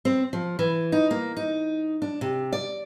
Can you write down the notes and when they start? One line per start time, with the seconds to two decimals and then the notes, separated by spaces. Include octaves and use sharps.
0.05 C4
0.33 F3
0.59 E3
0.92 D#4
1.11 A#3
1.37 D#4
2.02 D4
2.21 C3
2.52 D5